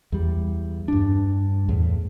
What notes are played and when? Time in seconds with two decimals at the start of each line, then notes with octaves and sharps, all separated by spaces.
0.12 E2 G3
0.88 G2 D4
1.69 E2 A2